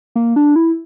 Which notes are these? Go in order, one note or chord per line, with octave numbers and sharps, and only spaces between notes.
A#3
D4
E4